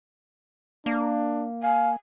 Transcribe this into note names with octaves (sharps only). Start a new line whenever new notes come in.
A#3 D4
F5 G#5